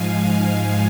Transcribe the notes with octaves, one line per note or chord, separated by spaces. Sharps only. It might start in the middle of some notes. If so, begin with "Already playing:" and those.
Already playing: G#2 F3 G#3 F5 G#5